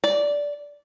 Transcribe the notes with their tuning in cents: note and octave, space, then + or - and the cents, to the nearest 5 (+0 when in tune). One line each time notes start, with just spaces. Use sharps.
D5 -10